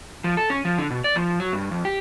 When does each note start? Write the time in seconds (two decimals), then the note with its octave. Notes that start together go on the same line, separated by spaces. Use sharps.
0.24 F3
0.37 A4
0.50 C#4
0.65 F3
0.78 D3
0.90 B2
1.04 D5
1.16 F3
1.40 F#3
1.53 G2
1.71 F2
1.85 G4